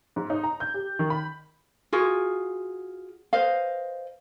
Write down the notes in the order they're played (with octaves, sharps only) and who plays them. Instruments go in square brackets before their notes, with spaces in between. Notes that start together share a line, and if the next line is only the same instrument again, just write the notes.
[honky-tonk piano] G#2
D#4
A#5
G6
G4
D#3
B5
[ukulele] F4 F#4 G#4
B4 C5 D#5 F5